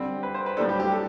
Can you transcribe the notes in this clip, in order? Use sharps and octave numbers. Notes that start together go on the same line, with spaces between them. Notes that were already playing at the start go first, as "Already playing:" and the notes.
Already playing: D3 G3 C4
B4
C5
B4
A2 G3 D4 A4
G4
G4
A4